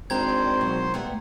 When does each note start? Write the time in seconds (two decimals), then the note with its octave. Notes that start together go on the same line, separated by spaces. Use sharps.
0.10 G#1 C4 D4 D#4 C5 A#5 C6 G#6
0.61 B2 F#3 F4
0.94 G3 A3 B3